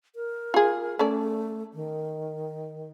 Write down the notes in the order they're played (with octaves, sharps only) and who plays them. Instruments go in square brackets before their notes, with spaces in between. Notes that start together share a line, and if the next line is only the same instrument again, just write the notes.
[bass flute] A#4
[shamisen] F4 G#4
[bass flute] A3 [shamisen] C#4 A4 D5
[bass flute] D#3